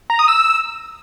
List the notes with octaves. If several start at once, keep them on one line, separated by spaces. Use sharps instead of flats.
A#5
D#6
E6